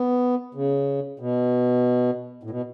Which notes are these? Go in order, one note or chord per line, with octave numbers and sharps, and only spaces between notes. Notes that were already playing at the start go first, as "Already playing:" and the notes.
Already playing: B3
C#3
B2
A2
B2